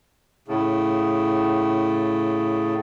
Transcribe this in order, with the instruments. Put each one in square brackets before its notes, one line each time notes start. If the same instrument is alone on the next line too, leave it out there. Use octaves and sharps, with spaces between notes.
[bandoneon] A2 C#3